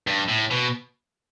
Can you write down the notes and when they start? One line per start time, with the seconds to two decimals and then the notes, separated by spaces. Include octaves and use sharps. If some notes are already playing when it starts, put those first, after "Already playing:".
0.07 G2
0.29 A2
0.51 B2